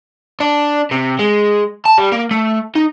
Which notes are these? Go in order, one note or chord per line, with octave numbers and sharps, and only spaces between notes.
D4
C3
G#3
A5
G3
A#3
A3
D#4